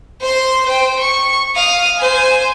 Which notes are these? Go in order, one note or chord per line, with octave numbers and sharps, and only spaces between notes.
C5 C6
C5 G5
C#6
F5 D#6
C5 G#5